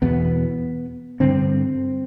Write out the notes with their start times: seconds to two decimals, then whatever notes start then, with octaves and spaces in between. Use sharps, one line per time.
0.02 E2 B2 B3
1.20 G2 D3 C4